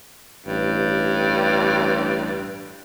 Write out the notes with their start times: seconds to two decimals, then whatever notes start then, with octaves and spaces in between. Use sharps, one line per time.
0.46 A1 G2